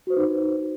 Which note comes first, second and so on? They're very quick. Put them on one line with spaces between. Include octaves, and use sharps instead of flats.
F#4 C5 B4 D#4